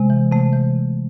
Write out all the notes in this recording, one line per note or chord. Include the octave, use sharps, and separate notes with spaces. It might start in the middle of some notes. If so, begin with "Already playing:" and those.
Already playing: C3 G#3
E3
C3 A3
E3
C3